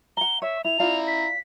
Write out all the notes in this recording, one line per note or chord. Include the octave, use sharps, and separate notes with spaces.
F#5 A#5 G7
C#5 E5
E4 F7
E4 F4 D5 F5 A#5
B6